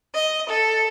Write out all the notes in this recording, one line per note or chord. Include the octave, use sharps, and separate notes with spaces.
D#5
A4